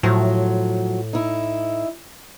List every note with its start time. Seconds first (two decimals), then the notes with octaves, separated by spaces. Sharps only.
0.03 A2 F3 F#3
1.13 D#4 E4